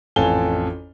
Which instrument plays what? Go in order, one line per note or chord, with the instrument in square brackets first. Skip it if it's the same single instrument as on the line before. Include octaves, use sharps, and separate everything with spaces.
[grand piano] A1 F2 A4 F5 G#5 G7